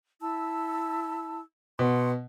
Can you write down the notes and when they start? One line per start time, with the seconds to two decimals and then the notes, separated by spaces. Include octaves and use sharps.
0.21 E4 A5 E6
1.79 B2 F#5 C6